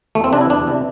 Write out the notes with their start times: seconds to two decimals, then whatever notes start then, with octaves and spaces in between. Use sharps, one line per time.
0.15 E2 A3
0.24 C4
0.33 C3 E3 D4
0.41 E4
0.50 E2 D4
0.67 C3 E3